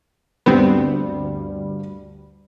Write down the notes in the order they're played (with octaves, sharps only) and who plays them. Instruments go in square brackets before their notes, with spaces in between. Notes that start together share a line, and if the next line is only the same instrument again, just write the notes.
[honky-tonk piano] D2 G2 G3 [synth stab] B3 C4